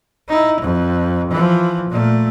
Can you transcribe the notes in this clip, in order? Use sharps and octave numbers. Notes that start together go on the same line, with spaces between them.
D#4 E4
F2
E3 F3
A#2 A3